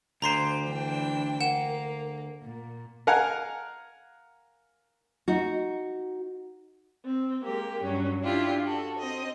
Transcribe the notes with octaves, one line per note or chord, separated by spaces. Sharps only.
D2 C5 A#5 C6 D6 C7
E3 D4 G5
A#3 F#5 E7
A#2
A#4 F5 F#5 G#5
D#4 F#4
C4
G#3 A#3 G4
G2 F#3 C#4
D4 E4 F4 G4
F#4 A4
C4 D#5